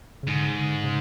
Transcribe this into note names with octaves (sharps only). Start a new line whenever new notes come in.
C#3
G#2 D3
C#3
D3
C#3